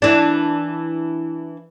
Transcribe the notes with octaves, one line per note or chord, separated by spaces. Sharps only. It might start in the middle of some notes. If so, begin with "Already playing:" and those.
E3 D4